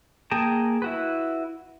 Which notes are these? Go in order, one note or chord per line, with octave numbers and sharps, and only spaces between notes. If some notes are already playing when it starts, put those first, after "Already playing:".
A#3 G#4 G5 A5 A#5
E4 F#4 B4